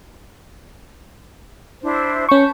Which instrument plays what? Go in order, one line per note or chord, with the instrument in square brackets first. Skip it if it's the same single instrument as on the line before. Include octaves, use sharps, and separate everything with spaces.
[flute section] D4 E4 C5
[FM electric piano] C#4 C#6 [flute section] B4 A5 G6